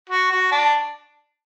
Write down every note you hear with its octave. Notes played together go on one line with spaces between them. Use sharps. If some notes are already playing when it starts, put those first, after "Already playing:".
F#4
F#4
D4